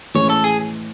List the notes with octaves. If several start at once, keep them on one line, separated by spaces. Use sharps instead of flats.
A2 E3 G#3 C#4 C#5
A4
G#4